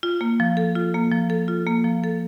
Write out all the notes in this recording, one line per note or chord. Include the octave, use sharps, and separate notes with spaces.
F4
A#3
F3
A4
F4
A#3
F3
A4
F4
A#3
F3
A4